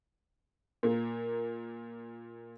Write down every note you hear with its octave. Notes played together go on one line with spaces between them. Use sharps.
A#2 A#3